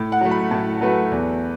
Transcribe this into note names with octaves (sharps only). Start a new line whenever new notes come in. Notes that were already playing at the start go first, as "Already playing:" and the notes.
Already playing: A2
F#5
F#3 A3
B5
A2 A5
F#3 A3 B4
E2